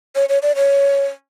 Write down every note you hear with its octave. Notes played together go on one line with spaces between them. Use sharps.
C#5
C#5
D5
C#5